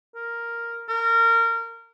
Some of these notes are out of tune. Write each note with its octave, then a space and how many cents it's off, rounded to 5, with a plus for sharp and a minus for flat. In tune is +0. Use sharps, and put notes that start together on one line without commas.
A#4 +0
A#4 -25